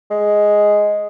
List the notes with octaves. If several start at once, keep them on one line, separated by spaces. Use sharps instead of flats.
G#3